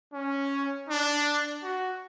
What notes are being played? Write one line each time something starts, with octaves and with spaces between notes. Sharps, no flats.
C#4
D4
F#4